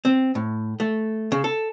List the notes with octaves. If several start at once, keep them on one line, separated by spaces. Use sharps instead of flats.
C4
A2
A3
C#3
A4